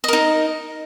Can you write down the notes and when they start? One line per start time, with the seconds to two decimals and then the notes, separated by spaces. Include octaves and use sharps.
0.04 D#5
0.08 A#4
0.13 D#4